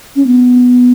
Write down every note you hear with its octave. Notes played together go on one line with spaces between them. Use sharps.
C#4
B3